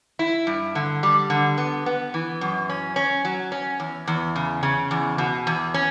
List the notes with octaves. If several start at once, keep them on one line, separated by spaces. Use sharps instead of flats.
E4
G2
D3
G3
D3
B3
B3
E3
F#2
C#4
C#4
F#3
C#4
E2
E2
C#3
C#3
E2
B2
E2
C#4